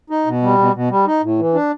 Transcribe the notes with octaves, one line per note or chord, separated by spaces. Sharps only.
D#4
B2
G3
B2
B2
G3
D#4
A2
E3
D4